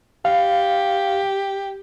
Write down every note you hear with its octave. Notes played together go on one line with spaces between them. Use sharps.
G4 F5